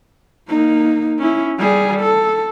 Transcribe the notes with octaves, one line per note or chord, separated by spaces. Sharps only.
A#3 D#4
C#4 E4
G3 G#4
A4